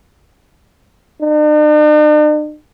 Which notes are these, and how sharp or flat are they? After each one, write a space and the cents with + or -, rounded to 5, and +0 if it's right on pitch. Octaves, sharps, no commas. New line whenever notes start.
D4 +45